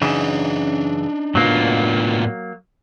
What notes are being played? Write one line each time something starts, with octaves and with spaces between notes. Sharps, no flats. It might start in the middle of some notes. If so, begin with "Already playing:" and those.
F#2 C#3 E3 D4 D#4
A2 F#3 A#3 B3 F4